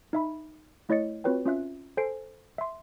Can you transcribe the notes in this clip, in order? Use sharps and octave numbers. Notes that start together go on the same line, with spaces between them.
D#4 E5 B5
A3 E4 C#5 D#5 A6 C#7
C4 F4 F#4 B4 C#5 G5
C#4 F4 E5 F#6
A4 C5 G#5 C7 D7
E5 C6